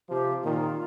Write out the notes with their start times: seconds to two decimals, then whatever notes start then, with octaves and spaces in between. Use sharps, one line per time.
0.09 C3 F3 G4
0.43 A#2 D#3 F4